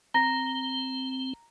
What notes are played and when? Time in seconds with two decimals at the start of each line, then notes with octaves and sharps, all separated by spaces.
0.14 C4 A#5 A#6